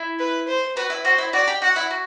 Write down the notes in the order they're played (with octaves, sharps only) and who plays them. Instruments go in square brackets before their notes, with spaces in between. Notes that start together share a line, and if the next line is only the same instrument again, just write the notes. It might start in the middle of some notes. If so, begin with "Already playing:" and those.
Already playing: [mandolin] E4
[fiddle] B4
C5
[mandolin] F#4 [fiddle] B4
[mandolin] E4
[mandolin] F#4 [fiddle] C5
[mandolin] E4
[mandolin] F#4 [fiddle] D5
[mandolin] G4
[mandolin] F#4 [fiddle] F#5
[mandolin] E4
F#4